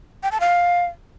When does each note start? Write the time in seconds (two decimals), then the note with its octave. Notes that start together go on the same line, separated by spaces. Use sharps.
0.23 G5
0.32 A5
0.40 F5